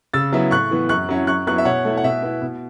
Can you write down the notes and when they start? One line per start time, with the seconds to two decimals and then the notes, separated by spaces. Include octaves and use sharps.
0.14 C#3 E6 A6
0.32 F#3 B3 E4
0.51 A2 C#6 F#6
0.71 E3 B3
0.89 F#2 C#6 F#6
1.09 F#3 C#4 E4
1.27 F#2 C#6 F#6
1.47 F#3 B3 E4 C#6 F#6
1.58 E5
1.65 B2 C#5 F#5
1.85 A3 E4
1.97 F#5
2.04 B2 E5
2.22 B3 E4
2.42 B2